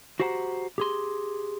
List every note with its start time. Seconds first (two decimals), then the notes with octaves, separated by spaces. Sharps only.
0.20 F#4 G4 C5 F#5 A5 A#5
0.78 G4 G#4 C6